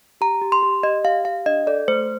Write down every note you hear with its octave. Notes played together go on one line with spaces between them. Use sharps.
G4 A#5
G4
C6
G4
G4 D#5
G4 F5
G4 F5
D4 D#5
A4 D5
A3 C5